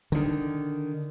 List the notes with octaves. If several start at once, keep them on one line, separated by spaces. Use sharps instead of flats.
D3 D#3